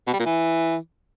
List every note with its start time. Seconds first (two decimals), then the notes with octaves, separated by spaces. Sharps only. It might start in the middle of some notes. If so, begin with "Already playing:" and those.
0.07 B2
0.14 G3
0.20 A#2
0.26 E3